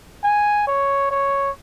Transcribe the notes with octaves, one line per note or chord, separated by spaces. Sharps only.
G#5
C#5
C#5